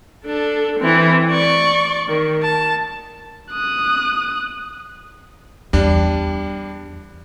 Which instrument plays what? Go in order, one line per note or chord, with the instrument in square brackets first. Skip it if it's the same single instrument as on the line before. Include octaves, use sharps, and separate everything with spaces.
[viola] D4 A4
E3 C4
D5 C#6
D#3
A5
[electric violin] D#6 F#6
[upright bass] E2 [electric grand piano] G3 D4